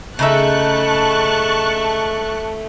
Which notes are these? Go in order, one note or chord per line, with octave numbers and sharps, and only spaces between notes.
C#3 A3 D#4 E5 A5 C#6 F#6